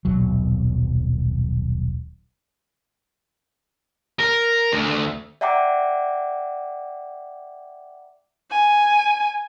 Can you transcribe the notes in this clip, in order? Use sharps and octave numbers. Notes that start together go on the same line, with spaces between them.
D#1 B1 F#3
A#4
D2
D5 E5 F#5 G5 A#5 D6
G#5